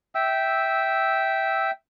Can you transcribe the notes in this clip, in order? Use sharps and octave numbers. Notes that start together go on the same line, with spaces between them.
E5 G5 E6